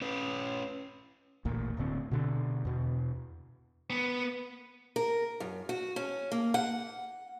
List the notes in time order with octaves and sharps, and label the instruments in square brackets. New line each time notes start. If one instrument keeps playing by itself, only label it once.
[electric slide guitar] C#4 B4
[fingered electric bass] A1 D2 A#2
D1 A2 D3 C4
B2 D3
E2 B2
[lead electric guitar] B3
[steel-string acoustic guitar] A#4
F#2
F#4
C#4
A#3
F#5